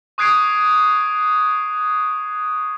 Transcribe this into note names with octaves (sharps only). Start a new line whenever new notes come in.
C#6 D#6 F#6 G#6 C7 D7